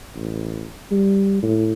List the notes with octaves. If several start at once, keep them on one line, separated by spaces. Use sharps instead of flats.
A1
G3
A2